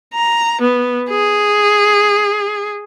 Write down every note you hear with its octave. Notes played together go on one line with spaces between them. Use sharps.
A#5
B3
G#4